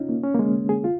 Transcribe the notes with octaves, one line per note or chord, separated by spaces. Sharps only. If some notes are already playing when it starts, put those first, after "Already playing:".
Already playing: C#4 D#4 F4
A#3
C#4
A#3
G#3
G#4
F4